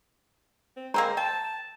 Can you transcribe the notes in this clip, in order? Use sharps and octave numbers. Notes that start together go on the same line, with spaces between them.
C4
G#3 A#3 C4 C5 A#5
G5 A5